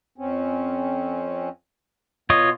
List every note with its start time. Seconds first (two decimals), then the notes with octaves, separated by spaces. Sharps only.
0.18 F2 C4 C#4
2.30 B2 B3 F4 C#5 D#5